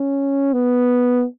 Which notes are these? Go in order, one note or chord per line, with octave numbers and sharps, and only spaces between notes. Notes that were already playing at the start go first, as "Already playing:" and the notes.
Already playing: C#4
B3